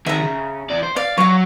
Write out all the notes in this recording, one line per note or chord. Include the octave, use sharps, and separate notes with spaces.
D#3 G#4 E5 A#5
C#3
E2 D5
C5
D5 F5
F#3 F#4 C#5 F5